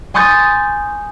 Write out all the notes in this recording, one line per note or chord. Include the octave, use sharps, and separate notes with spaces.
G#5 C6 C#6 D#6 G6 A6